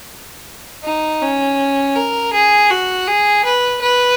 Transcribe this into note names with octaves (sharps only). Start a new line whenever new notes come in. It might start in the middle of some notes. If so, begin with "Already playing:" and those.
D#4
C#4
A#4
G#4
F#4
G#4
B4
B4